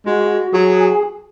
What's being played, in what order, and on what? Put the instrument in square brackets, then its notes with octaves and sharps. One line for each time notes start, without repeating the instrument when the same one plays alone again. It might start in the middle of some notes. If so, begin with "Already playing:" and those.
[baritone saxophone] G#3 [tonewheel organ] F#4
[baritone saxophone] F#3 [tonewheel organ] G#4